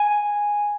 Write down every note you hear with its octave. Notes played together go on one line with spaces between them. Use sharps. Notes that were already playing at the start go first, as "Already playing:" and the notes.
Already playing: G#5